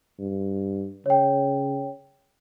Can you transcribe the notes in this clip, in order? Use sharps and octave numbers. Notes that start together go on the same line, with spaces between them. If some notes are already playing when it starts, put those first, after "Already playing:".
G2
C#3 C#5 G5